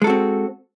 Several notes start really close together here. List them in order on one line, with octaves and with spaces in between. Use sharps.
G#3 A4 F#4 C4